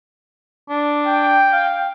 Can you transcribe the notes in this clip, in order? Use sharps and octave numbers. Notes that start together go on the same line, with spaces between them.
D4
G5
F5